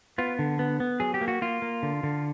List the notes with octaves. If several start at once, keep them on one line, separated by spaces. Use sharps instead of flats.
B3 F4
D3
B3
B3
F#3 G#4
G4
A#3
F#4
A#3 F4
A#3
D3
D3